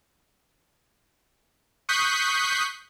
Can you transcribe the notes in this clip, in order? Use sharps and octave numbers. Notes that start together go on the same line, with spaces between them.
C#6 D#6 F#6 G6 B6 C7